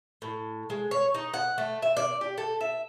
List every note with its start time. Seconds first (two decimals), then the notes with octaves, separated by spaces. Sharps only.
0.22 A2
0.70 G#3
0.91 C#5
1.14 D#4
1.34 F#5
1.58 A3
1.82 E5
1.97 D5
2.21 G4
2.38 A4
2.61 E5